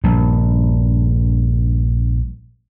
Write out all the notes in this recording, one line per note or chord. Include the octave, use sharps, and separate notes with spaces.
A#1 G2